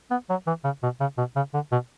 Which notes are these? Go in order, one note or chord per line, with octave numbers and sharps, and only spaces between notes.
B3
F#3
E3
C#3
B2
C#3
B2
C#3
D3
B2